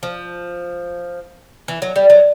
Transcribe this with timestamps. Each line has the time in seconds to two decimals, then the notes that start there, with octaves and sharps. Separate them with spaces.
0.03 F3
1.68 E3
1.82 F#3
1.96 G3
2.10 F#3